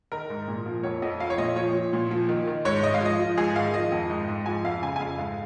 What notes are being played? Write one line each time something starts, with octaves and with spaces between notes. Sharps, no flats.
D#3 A#4
G#2
A#2
F3
F2 C#5
F2 D#5
F3 F5
C#5
A#2 D#5
F3 C#5
F3
A#2
F3
D#3
D#3
G#2 C#5
G#2 D#5
F5
F3 D#5
F3
G#2 G#4
D#3 F5
F3 D#5
F2
G#2
G#2
F3 G#5
F2 F5
C#3 G#5
G#5
F2 F5
G#2 F5